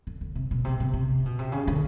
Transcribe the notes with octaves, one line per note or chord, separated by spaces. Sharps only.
D3
D3
C3
B2
C3
C3
C3
B2
C3
C#3
D3